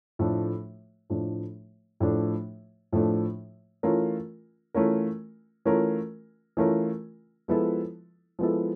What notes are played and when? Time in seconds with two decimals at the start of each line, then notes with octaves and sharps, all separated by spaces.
0.19 A2 F3 A3 D4
1.10 A2 F3 A3 D4
2.00 A2 F3 A3 D4
2.93 A2 F3 A3 D4
3.83 E3 A3 C#4 F4 A#4
4.74 E3 A3 C#4 F4 A#4
5.65 E3 A3 C#4 F4 A#4
6.57 E3 A3 C#4 F4 A#4
7.48 F3 G#3 B3 E4 A4
8.39 F3 G#3 B3 E4 A4